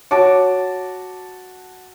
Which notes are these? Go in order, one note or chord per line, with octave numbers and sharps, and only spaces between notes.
F#4 C#5 A5 D6